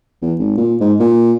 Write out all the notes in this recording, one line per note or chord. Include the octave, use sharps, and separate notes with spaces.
E2
G#1
A#2
G#2
A#2